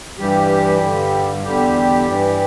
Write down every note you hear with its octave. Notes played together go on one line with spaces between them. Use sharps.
G2 E3 G3 G4
G2 D3
E2 D3 G3 G4
G2 E3